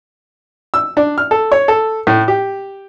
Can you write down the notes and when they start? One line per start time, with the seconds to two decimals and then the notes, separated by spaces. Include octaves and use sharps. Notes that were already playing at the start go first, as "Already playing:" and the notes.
0.74 E6
0.97 D4
1.18 F6
1.31 A4
1.52 C#5
1.68 A4
2.07 A2
2.28 G4